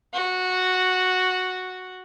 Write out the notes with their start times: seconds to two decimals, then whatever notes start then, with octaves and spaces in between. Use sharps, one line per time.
0.13 F#4